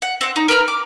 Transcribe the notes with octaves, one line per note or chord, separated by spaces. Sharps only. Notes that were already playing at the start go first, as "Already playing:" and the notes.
F#5
C4 F#5
D#4
A#4 B4 A#5 F6
D6